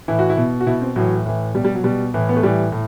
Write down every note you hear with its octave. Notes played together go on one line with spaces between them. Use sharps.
A2 E3 E4
F#4
E4
B2
F#4
B2 E4
C4
A2 E3 F#3
A2 E3
B2 G3
G3
F#3
B2 G3
A2 E3
B3
A3
A2 E3 G3
A2